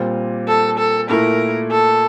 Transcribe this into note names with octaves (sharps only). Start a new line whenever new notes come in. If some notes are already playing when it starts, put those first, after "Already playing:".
Already playing: A#2 G3 C4 F4
A4
A4
A#2 A3 E4 A#4
A4